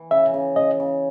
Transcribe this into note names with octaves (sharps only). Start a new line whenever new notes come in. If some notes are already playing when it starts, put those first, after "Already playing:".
Already playing: E3
C#3 E5
C#3
C#3 D#5
C#3